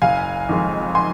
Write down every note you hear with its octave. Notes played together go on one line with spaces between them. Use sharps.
F#1 F5 G#5
F2 D#3 G#3 D#4
G#5 C6